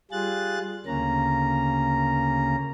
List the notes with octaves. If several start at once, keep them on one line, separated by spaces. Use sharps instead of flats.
G3 F4 G#4 F#6 A6
D2 C#3 A#3 C#4 A#5